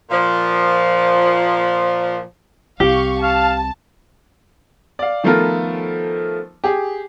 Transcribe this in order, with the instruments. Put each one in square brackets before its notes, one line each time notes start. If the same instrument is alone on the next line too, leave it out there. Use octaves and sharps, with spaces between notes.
[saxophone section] A#2 F3
[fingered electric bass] C2 C3 [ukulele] G4 [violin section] F5 C#6
[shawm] F5 [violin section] A5
[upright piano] D5 F5
D#3 F3 A3 B3 F4 A#4
G4 G#4